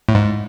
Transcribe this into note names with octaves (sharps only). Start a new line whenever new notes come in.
A2
G#2